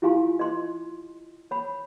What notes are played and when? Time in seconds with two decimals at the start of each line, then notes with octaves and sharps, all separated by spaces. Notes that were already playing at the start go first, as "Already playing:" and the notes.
0.02 E4 F4 G4 F5 G#5 C6
0.39 D#5 C6
1.51 C#5 B5